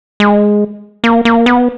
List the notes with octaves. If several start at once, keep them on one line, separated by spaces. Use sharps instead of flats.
G#3
A#3
A#3
B3